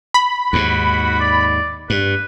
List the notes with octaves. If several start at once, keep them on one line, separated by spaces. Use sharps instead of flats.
B5
D#2 G#2 F#4
D5
G2 B4